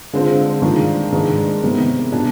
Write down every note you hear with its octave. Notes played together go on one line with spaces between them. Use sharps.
D3 G#3 C4 F4
D#3 G#3 D4 F4
G#2 D#3 G#3 D4
C3 D#3 B3
B2 G#3 D4 G#4